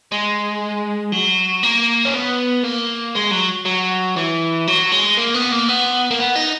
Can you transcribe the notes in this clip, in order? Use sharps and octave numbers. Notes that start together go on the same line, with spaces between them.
G#3
F#3
A#3
C#4
B3
A#3
G#3
F#3
F#3
E3
F#3
G#3
A#3
B3
A#3
B3
A#3
B3
D#4